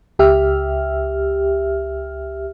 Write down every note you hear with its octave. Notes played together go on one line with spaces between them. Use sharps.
C#2 G4 E5 F6